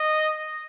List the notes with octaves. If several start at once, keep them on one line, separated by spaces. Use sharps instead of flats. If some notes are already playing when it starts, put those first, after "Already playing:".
Already playing: D#5